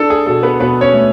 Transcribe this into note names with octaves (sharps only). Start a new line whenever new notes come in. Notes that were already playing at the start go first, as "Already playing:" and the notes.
Already playing: D4 A4
G#4
B2 A4
B3 B4
B2 B3 B4
C#4 C#5
A3